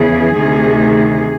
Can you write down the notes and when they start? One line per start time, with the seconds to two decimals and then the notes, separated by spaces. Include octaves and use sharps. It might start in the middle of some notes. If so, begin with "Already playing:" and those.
Already playing: E2 C#3 E3 G#4
0.35 D2 C3 D#3